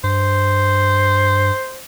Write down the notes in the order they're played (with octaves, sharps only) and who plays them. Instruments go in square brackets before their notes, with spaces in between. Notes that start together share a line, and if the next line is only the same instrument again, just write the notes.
[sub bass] G2 [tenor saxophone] C5